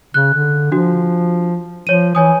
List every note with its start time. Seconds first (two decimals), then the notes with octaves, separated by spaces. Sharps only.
0.14 C#3 F#6
0.35 D3
0.72 F3 D4 F#4
1.87 F3 C#5 D#7
2.15 E3 C#5 G#5 D#6